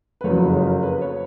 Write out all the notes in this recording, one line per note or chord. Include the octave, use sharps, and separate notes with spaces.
B4
F#1 F2 C#3 F#3 C#5
A#4
B4
C#5